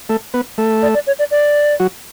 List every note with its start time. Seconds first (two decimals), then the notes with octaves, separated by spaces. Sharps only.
0.09 A3 A4
0.34 B3 B4
0.58 A3 A4
0.82 D5
0.94 D5
1.07 C#5
1.19 D5
1.31 D5
1.80 F#3 F#4